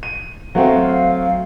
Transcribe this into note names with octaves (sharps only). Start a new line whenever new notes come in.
D#7
F#3 A3 C4 F5 F#5
F5